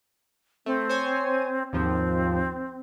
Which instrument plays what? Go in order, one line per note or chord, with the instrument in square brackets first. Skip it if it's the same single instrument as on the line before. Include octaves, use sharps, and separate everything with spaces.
[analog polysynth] A3 [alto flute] C4
[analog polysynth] C5 C#5 G#5
[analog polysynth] D#2 G#2 F3 [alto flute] C4